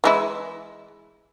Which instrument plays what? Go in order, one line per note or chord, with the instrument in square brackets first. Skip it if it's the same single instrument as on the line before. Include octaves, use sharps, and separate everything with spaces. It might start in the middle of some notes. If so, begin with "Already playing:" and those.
[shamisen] E3 G#3 E4